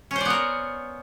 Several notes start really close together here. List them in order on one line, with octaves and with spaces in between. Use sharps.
C#4 C5 D5 B3 A#4